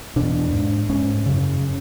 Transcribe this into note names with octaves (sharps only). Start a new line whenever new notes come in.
E2 B2 D4
G#2
G#2 C#4
F#2 C#3